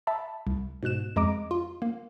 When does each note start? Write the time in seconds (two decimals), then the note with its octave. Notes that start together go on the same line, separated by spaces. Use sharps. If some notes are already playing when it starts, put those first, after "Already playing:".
0.07 E5 A5 B5
0.47 C2
0.83 G#2 B2 F#6 E7
1.16 F2 G#3 A#5 D6 D7
1.51 F4
1.82 A#3